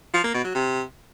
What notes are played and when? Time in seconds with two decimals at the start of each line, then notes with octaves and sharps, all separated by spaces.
0.14 F3
0.24 A#3
0.34 B2
0.44 F#3
0.55 C3